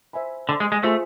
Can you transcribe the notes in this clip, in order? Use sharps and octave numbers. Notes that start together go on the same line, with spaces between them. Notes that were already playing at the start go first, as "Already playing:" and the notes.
C5 E5 G#5 B5
D3
G#3
G#3
A3 F4 G#4 C5 E5